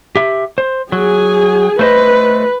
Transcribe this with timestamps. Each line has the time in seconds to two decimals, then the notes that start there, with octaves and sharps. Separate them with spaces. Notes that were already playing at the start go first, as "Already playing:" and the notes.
0.16 G4 E5
0.58 C5
0.92 F#3 G#4 G#5
1.79 A3 B4 C5 D#5